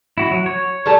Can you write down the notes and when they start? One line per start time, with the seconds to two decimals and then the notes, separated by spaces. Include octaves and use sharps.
0.18 E4 F#4
0.31 F#3
0.46 C#5
0.86 G3 A3 A5